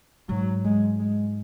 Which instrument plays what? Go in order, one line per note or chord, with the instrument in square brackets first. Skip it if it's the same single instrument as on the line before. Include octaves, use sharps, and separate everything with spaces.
[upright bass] G#2 [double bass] F#3
[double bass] G#3
G#3